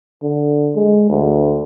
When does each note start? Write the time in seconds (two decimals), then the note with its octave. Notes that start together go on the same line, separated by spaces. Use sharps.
0.23 D3
0.75 G#3
1.09 D2